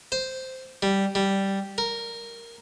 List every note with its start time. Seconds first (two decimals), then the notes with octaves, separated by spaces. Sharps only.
0.12 C5
0.82 G3
1.15 G3
1.78 A#4